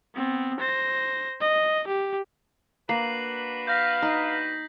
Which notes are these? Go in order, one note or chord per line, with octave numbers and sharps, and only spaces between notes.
B3 C4
C5 A#6
D#5
G4
A#3 D4 F#4 B4 C7 F#7
F5 G6 A#6 B6
D#4